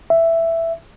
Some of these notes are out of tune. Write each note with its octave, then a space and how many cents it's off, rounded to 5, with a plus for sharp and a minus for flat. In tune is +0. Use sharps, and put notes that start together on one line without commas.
E5 +5